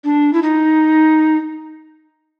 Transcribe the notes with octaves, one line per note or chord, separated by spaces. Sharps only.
D4
E4
D#4